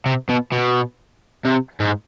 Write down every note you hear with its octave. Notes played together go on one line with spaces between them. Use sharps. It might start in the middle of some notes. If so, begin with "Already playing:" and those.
C3
B2
B2
C3
G#2